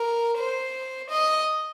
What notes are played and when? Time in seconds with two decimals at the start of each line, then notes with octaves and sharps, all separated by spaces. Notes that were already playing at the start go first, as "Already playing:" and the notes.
Already playing: A#4
0.38 C5
1.10 D#5